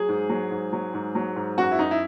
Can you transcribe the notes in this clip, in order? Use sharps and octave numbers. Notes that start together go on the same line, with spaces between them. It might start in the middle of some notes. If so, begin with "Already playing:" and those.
Already playing: F#3 G#4
G#2
F#3
G#2
F#3
G#2
F#3
G#2
F#2 F#4
E4
F#2 D#4
E4